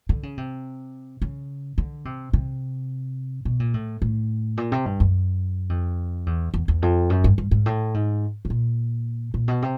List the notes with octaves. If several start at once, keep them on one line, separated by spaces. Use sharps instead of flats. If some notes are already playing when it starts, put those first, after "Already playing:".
D3
C#3
C3
C#3
D3
C3
C3
B2
A#2
A2
A2
A#2
C3
G2
F#2
F2
E2
E2
E2
F2
F#2
G2
G2
G#2
A2
G#2
B2
A#2
A#2
B2
C3